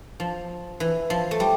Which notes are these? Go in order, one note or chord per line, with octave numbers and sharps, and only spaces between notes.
F3
E3
F3
A3
G3